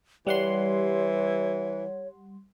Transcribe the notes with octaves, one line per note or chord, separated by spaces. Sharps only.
E3 G3 C#5 F#5 C6